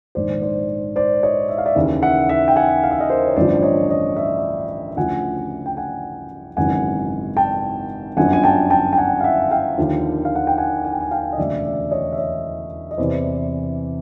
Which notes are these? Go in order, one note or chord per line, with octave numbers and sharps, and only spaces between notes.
A#1 G#2 D#3 C5 D5
C5 D5
C5 D5
C#5 D#5
E5
F5
D5 E5
D#2 C#3 E3
E5 F#5
E5 F#5
G5
F#5 G#5
F5
E5
D#5 F5
A#4 C5
C#5
A1 G2 D3 F3 C5 D5
C#5 D#5
C#5 D#5
D5 E5
D2 C#3 F3 F#5 G#5
G5
F#5 G#5
G#1 F#2 C#3 E3 F#5 G#5
G5 A5
G1 F#2 D3 F3 F#5 G#5
G#5
G5 A5
G5 A5
G5
F#5 G#5
F5
E5 F#5
F5 G5
D#2 D3 F3
F5
F#5
G5
F#5 G#5
G#5
G5
F#5 G#5
F5 G5
D#5
E1 D2 C#3 D5 E5
D5 E5
C#5 D#5
E5
C#5 D#5
D#5
E2 C3 E3 C5 D5